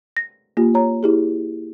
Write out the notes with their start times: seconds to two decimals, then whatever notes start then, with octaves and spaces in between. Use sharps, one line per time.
0.17 A#6
0.57 A#3 F4 G4
0.74 C#5 A#5
1.03 E4 G4 G#4